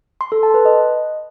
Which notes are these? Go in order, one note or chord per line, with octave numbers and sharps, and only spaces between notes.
C6
A4
A5
B4
D#5